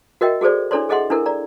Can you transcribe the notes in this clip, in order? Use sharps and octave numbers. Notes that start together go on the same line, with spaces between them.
F#4 A#4 D#5 E5 G5
F#4 G#4 A4 C5 D5
D4 E4 A4 C#5 D5 C6
G#4 A4 D#5 E5 F#5 C6
D4 E4 A4 A#4
D5 A#5